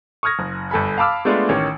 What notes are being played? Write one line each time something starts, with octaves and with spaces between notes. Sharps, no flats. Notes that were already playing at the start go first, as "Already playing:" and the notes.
C#6 D#6 F6 G#6 A#6
F#1
G1 A4 G#5 B5
F5 A5 B5 D6 E6 F6
G#3 A3 B3 D4 F4
A1 D#3 C#4